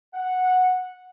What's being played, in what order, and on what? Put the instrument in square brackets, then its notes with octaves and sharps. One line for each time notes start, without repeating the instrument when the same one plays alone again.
[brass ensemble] F#5